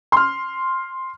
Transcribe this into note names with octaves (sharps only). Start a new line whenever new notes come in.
C6 F6